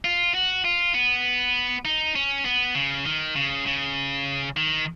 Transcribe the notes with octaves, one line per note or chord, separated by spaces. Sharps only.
F4
F#4
F4
B3
D#4
C#4
B3
C#3
D#3
C#3
C#3
D#3